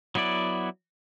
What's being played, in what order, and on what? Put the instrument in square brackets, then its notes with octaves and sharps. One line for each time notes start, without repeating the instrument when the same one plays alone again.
[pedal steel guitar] F#3 B3 E4 D5